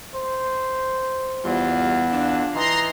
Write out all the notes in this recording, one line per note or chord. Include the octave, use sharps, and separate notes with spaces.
C5
E2 G3 F4
D4 F4
E3 D#4 A#5 C6